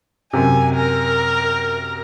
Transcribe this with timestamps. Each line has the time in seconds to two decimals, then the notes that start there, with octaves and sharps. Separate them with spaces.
0.33 F#2 C3 G#5
0.76 A#4